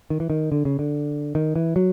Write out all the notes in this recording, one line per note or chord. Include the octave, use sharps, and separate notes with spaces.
D#3
E3
D#3
D3
C#3
D3
D#3
E3
F#3